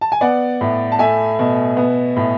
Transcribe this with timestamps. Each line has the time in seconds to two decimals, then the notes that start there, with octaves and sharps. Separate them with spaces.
0.01 A5
0.12 G#5
0.21 B3 D5 F#5
0.61 A2
0.92 A5
0.99 A3 E5 G#5
1.39 B2
1.77 B3
2.16 A2